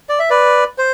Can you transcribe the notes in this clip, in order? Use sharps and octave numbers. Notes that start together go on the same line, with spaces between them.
D5
E5
B4 D5
C5